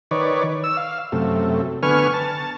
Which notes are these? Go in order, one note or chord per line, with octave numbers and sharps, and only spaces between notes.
D#3 B4 C#5 D5
E6
F5
F#2 C3 A3
D3 B3 B4 G#5 C#6 F6
A5